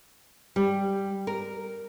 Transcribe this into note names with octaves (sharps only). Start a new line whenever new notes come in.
G3
A#4